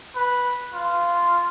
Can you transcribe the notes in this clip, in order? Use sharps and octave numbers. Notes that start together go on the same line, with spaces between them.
B4
F4